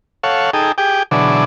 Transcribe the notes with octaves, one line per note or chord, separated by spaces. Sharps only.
A4 C#5 F5 F#5
D#4 G#4 A4 G5
G4 G#4 G5
B2 D3 E3 F#3 D4 G#4